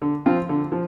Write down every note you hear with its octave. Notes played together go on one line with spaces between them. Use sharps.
D3
F3 C4 F4
D3
F3